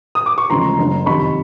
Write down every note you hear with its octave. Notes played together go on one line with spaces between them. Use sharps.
D#6
D6
C#6
E1 D2 C#3 F3 G#3 A#5 C6
F#1 F#2 D3
F2 C3 D#3 B5 C#6